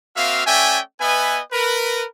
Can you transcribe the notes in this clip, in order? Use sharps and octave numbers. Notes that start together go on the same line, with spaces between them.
A#3 C4 F#4 E5 F5
A3 C#4 D5 E5 G5 G#5
B3 B4 D#5 E5 G#5
A#4 B4